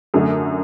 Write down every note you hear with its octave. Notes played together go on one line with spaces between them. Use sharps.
F#2 D3 A3